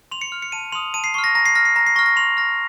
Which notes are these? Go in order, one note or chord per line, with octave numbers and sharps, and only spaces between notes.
C6 F7
C#7
F6
C#7
A5 D#7
C6 D#6 F7
A5 D#7
C7
C#6 F6 C7
A#6
A#5 A#6
C7
F6 A#6
C7
A#5 A#6
C7
C#6 F6 A#6
A#6
C6 F7
F6 A#6